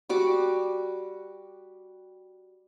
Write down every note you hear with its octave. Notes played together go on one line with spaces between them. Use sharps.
G3 F#4 D6